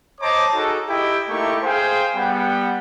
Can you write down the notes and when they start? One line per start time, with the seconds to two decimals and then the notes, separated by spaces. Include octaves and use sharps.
0.21 C5 C#5 D#5 A5 A#5 D6
0.54 D#4 F#4 G#4 A4
0.89 E4 G4 D#5 E5 G5
1.30 A3 A#3 D#4 E4 G4 C#6
1.63 G#4 C5 F5 G5 G#5
2.16 G3 B3 F#5 G5